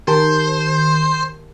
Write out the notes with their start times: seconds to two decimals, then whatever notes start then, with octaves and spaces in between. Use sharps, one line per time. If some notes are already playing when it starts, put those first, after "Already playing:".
0.08 D#3 G4 A#4 C5 A5